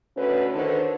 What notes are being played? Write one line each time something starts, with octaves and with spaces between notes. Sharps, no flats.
D2 C#4 B4
D3 D#3 D4 C5 C#5